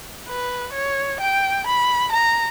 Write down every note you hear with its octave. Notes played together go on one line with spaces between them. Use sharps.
B4
C#5
G5
B5
A#5